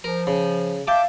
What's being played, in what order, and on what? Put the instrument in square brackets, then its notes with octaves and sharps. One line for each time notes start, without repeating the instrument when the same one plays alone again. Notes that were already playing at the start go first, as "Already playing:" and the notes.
[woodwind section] F3 [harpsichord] A#4
[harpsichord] C#3
[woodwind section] E5 A5 [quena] F5 [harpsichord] G5 D6